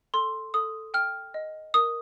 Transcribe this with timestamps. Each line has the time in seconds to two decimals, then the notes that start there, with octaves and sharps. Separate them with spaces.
0.14 A4 C6
0.54 A4 D#6
0.94 G5 F6
1.34 D#5
1.74 A#4 D#6